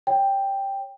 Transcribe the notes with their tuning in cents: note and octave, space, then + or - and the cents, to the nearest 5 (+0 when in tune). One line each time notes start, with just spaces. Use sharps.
C#5 +0 G5 +5